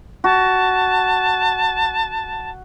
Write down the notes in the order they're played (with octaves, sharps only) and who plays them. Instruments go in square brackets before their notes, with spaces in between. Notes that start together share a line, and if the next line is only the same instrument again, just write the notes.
[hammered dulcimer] F#4 [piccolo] A5